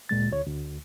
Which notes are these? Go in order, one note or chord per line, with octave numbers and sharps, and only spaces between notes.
D2 A#2 G#3 A6
D2 C#5
D2